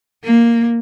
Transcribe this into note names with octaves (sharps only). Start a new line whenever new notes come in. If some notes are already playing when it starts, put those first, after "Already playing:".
A#3